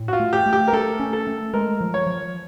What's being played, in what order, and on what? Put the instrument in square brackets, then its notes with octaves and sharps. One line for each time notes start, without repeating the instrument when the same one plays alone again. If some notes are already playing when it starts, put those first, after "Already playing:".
Already playing: [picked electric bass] A2
[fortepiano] F#4
F4
[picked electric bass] A3
[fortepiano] G4
[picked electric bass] A3
[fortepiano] G4
A#4
[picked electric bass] A3 [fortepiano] A4
[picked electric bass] C#4
[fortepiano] A4
[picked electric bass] A3
[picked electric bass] G#3 [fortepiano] A#4
[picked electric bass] F3
[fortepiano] C#5
[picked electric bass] F3